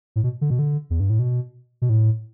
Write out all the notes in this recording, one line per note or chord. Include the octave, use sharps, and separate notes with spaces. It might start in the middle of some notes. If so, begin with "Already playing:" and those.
A2
B2
D3
B2
D3
E2
G2
A2
B2
B2
A2